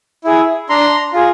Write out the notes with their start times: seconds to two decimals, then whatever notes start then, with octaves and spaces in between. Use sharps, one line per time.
0.24 E4 G#4
0.69 D4 A#5 C6
1.13 F4 G#4